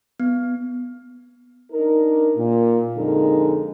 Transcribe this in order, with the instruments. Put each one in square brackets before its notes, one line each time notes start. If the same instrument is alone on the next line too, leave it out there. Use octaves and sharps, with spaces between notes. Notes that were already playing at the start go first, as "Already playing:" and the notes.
[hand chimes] B3
[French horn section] D4 D#4 A#4
A#2
F2 D3 G#3 D#4 A#4